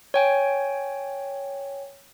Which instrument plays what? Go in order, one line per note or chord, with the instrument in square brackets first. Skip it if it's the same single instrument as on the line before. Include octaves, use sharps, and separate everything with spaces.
[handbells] C#5 G5 G#5